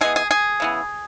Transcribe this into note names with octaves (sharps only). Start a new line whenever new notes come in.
E3 G#3 B3 G#4
G#4
G#4
C#3 E3 B3